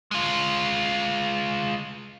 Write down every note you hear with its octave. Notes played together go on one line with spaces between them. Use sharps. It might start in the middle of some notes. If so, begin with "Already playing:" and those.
G#3 F4